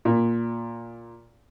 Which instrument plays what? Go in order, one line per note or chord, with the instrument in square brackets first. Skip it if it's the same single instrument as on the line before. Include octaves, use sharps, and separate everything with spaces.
[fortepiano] A#2